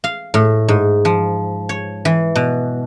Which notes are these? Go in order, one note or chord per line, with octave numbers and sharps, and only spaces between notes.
F5
A2
G#2
F3
C#5
E3
B2